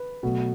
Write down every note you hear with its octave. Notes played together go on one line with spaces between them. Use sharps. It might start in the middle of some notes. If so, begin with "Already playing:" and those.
Already playing: B4
B2 F#3 A3